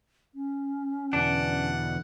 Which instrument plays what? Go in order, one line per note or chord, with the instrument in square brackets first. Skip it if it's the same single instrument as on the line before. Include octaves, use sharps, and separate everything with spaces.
[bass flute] C#4
[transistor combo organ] E2 B2 D3 [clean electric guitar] D4 [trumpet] F#5